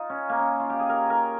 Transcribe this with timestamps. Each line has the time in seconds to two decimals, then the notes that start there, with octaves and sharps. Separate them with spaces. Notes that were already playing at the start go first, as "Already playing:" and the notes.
Already playing: D#4 F4
0.10 C#4
0.29 A#3
0.40 C#4
0.60 F4
0.70 G4
0.79 G#4
0.89 A#4
1.10 A#4